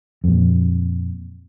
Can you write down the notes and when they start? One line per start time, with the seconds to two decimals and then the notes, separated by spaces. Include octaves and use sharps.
0.24 F2 A#2